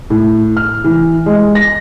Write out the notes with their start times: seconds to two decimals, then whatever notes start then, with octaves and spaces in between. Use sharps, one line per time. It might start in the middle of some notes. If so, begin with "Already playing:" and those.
0.10 A2
0.57 F6
0.84 E3
1.26 G#3
1.55 A#6